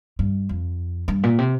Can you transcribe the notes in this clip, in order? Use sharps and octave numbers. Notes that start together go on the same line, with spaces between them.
G2
F2
G2
A#2
C3